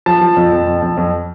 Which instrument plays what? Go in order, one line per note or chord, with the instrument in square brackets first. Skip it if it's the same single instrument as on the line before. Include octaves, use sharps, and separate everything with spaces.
[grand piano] F3 A5
F3
F2
F2
F2
F2
F2